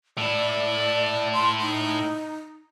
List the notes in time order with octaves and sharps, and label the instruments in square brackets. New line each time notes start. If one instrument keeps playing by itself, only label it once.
[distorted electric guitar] A2 E4 [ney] D5
[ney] C6
D#4